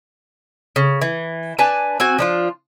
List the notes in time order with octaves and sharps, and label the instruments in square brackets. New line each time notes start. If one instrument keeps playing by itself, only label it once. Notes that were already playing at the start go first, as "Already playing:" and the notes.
[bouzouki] C#3
E3
D4 B4 G#5 A5
C4 F#4 G#5
F3 D4 F4